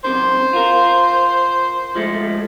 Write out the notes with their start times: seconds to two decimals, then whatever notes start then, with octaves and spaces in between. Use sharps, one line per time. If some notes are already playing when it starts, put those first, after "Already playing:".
0.04 F#2 C3 D#3 C5
0.53 F4 A#4
1.95 F3 G#3 A3